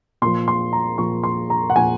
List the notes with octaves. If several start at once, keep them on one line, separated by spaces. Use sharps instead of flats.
A#2 F3 C6
C6
A#5
A#2 F3 C#6
C6
A#5
F#5
A#2 F3 G#5